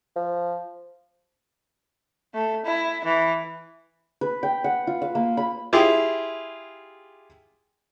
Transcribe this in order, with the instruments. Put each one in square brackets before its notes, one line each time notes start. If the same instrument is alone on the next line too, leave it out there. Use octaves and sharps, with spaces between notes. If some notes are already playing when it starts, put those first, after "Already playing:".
[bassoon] F3
[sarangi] A3
E4
E3
[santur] B4
G5
F#5
F4
F5
A#3
B5
[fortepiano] E4 F4 G4 G#4